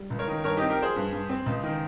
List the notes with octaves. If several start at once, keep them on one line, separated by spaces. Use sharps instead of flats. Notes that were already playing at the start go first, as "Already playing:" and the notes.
Already playing: G3
C#2
A#4 C#5
D#3
G2 A#4 C#5
C4 D#4 G4
G4 A#4
F3 G#4 C5
G2
G2
C4
C#2
D#3